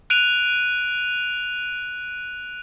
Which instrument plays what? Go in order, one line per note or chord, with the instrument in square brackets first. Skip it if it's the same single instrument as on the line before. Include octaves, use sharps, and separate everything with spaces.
[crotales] F#6 D7 D#7 F7